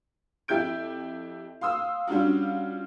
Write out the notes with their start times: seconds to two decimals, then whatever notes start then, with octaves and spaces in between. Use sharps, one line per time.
0.48 F2 E4 G4 G6 D7
1.61 F5 C6 D#6 E6
2.07 G3 C#4 D4 F4 F#4